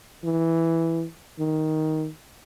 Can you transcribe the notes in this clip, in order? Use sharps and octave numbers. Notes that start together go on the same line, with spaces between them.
E3
D#3